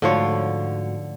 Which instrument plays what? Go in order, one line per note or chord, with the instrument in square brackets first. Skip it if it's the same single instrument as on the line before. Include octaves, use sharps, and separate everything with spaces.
[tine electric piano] G#2 A3 F#4 [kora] D3 F3 C#5